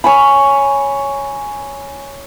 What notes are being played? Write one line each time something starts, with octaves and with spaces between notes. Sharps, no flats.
C#5 G#5 B5